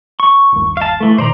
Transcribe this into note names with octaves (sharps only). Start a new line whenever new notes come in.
C#6
G1 D#2
F5 A5
E3 A3
A#2 D#3 C5 D5 A#5